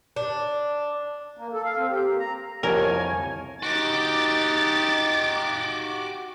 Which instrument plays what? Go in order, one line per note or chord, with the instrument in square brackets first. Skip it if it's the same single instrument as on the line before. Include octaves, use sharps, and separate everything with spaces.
[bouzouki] D4
[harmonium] A#3
A4
F5
C4
G4
A#3
A#5
[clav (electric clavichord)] C2 F2 G4 [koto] A#4 [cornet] C#5 [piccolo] G#5
[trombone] D#4 [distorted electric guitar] F#4 G4 [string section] D6 [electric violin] A6